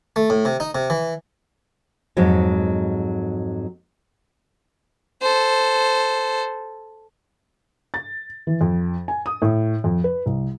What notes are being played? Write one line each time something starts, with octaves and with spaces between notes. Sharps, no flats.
A3
A2
C3
D#4
C3
E3
F2 G#2 F#3 G#3
A4 C5
A6
E3
F2
G#5
D#6
A2
F2
B4
C2